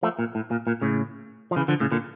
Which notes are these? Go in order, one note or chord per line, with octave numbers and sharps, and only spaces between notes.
F3 A3
A#2
A2
A#2
A#2
A2 C#3
F3
C#3 E3
D3 F3
A2 C#3
A#2 D3